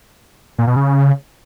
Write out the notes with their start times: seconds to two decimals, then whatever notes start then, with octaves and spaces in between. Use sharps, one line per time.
0.58 A#2
0.67 B2
0.76 C#3